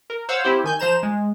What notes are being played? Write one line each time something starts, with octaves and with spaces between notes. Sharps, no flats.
A#4
C5 C#5 F5 F#5 E6
C4 E4 G4 C5
D#3 G#5 G6
F3 C5 A#5 E7
G#3